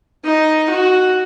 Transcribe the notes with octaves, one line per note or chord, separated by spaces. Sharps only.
D#4
F#4